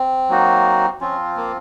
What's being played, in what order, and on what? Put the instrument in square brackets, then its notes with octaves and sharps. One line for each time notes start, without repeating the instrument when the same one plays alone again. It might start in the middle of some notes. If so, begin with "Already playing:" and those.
Already playing: [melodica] C4
[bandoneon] F#3 A#3 D#4 F#4
[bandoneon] F3 C4 F4 [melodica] C#4
[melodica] A#3